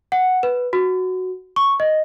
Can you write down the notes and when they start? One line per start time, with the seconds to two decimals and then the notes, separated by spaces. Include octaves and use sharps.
0.12 F#5
0.43 B4
0.73 F#4
1.56 C#6
1.80 D#5